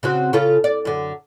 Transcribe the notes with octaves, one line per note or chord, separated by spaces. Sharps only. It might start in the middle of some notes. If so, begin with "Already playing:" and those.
C#3 C4 F#4
C#3 F4 A4
D5
F#2 D3